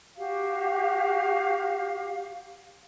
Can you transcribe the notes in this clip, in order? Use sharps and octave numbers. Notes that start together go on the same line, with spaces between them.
F#4 G4 F5